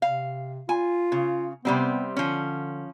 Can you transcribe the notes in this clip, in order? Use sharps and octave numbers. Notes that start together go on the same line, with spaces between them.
C3 F5
F4 G#5
C#3
C3 G3 B3 C4
D3 F3 C#4